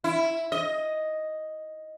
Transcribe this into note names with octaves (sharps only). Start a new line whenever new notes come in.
E4
D#5